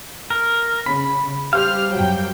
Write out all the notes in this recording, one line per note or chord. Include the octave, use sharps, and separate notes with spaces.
A#4
C#3 B5
G3 G4 C5 F5 F6
F#2 F#3 G5